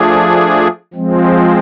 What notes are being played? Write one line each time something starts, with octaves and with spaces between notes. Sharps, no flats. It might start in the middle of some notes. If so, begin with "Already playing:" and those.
Already playing: F3 A3 D4 G#4
F3 G#3 C4